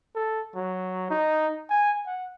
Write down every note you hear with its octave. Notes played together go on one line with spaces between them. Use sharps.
A4
F#3
D#4
G#5
F#5